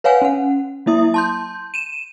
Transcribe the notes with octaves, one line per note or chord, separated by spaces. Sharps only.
B4 C#5 F5 F#5 G#5
C#4 F#5
F#3 A#3 E4 E5 D#6
A5 C6 G6
D#7 E7